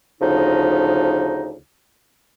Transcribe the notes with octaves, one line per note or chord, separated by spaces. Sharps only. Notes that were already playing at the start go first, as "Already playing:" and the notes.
D2 C#3 F3 D#4